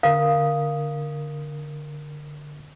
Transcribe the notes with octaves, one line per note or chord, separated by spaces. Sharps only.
D3 A#4 F5 D#6